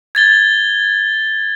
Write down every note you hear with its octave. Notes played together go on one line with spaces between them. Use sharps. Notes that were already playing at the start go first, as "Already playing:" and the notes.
G#6 A6 G7